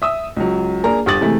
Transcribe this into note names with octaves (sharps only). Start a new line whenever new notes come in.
E5 D#6 E6
C#2 F#3
A#3 D4 G#4 A#4 A#5
G1 G4 D6 D#6 A6 F#7
C3 E3 G#3 A3 E4